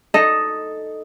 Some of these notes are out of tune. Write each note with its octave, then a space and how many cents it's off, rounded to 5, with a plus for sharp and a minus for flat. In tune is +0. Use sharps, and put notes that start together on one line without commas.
D#4 +0 A4 +0 D#5 +0